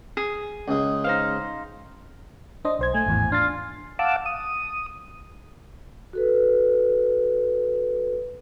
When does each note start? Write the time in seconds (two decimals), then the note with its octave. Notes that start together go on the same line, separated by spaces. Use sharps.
0.17 G#4
0.68 C#2 G#3
1.04 D#4 C5 F5
2.65 D4 C5 D#5
2.79 B1 C5 G#6
2.94 A3 G#5
3.06 G#1 E2 A2
3.32 D4 F4 A6
3.99 F5 F#5 A5 D6 E6
4.26 D#6
6.13 F#4 A4 B4